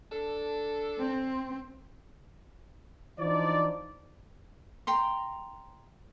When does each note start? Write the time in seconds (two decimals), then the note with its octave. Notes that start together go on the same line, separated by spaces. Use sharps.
0.12 D4 A4
0.98 C4
3.19 E3 F3 D4 D#4 C5 D5
4.87 G5 A#5 C6